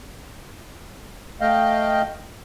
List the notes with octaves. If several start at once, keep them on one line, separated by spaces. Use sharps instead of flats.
A3 D#5 F5 G5